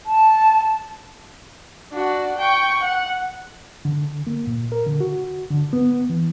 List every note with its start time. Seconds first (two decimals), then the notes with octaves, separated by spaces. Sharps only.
0.06 A5
1.92 D4 F#4
2.37 G5 C#6
2.81 F#5
3.85 D3
4.27 A#3
4.47 A#2
4.72 A#4
4.87 D3
5.01 F#4
5.51 D3
5.73 B3
6.10 E3